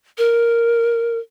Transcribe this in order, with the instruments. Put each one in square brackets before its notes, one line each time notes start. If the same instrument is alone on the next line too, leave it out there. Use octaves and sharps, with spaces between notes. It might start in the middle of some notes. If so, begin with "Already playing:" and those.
[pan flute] A#4